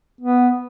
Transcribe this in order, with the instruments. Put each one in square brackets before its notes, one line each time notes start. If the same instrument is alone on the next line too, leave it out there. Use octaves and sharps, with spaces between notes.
[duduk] B3